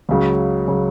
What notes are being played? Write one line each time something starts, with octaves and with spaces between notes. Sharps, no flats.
C#2 C#3 F#3
C#3 F#3